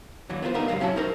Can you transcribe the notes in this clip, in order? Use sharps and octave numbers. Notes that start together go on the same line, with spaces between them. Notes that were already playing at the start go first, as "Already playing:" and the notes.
D#2 D3 E3 F#3
B3 F4 A#4 C5
D2 D3 G3 B3 D#4 A#4
C#2 G#2 B2 F#3 F5
F#3 C#4 E4 C#5 A5
D#4 E4 F#4 G4 A#4 C5